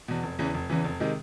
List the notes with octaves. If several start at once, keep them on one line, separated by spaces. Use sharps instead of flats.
E2 B2
F1
E2 C#3 E3
F1
E2 C#3 E3
F1
C3 D#3 G#3